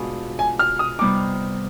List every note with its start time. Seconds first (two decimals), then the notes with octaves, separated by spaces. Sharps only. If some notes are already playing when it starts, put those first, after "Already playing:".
Already playing: B2 G#3 D4 F4
0.39 G#5
0.59 F6
0.79 D#6
0.99 C3 G3 B3 D#4 D6